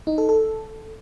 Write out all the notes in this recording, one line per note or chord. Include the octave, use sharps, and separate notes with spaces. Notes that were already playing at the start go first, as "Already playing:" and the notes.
D#4
A4
A4